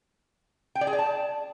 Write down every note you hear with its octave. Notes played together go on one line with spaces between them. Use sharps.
G5
D5
G#4
D5
A5